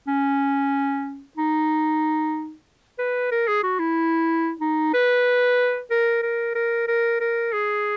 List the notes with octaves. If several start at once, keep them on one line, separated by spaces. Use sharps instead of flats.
C#4
D#4
B4
A#4
G#4
F#4
E4
D#4
B4
A#4
A#4
A#4
A#4
A#4
G#4